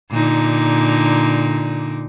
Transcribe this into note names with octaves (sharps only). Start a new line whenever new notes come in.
A#2 D3 D#4